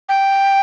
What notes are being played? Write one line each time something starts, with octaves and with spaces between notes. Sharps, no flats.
G5